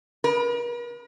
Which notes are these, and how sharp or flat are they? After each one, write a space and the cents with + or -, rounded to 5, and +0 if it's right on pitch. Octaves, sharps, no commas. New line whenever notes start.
A#4 +45